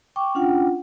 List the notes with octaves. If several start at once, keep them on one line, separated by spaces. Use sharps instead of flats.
G5 C#6 D6
C#4 D4 F4 F#5 G5